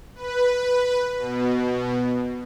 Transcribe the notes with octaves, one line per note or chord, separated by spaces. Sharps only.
B4
B2